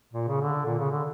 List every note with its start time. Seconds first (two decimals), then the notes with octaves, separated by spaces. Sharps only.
0.13 A#2
0.28 C#3
0.41 D3
0.66 A#2
0.78 C#3
0.91 D3